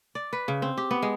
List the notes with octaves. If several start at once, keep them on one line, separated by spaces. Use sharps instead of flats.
D5
B4
C#3
C4
G4
B3
G#3